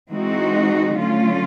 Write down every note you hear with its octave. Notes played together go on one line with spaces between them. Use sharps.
E3 G#3 C4 D#4 F#4
D3 F#3 A3 C#4 F4